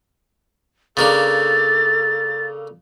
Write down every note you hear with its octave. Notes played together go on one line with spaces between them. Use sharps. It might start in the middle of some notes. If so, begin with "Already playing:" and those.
C#3 A#3 D4 A4 A6